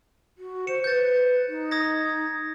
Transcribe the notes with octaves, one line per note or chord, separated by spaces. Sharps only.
F#4
C5 C#7 E7
B4 G6 A6
D#4
D#6 G#6 A#6